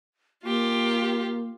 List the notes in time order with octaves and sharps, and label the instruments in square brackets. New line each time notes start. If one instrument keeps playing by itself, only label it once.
[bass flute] A#3 [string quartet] F4 G4